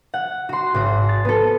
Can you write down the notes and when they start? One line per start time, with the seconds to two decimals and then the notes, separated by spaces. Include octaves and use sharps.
0.14 F#5
0.49 F#4 C6
0.74 G#1 F#4
1.09 A6
1.25 B3 A4